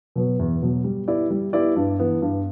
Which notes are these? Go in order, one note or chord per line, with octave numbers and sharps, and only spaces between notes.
B2 F#3 B3
E2
B2 F#3 B3
G3
B3 E4 G4 D5
G3
B3 E4 G4 D5
G2
E3 B3
G2